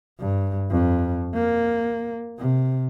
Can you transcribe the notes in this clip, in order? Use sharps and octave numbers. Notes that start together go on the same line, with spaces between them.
G2
F2
A#3
C3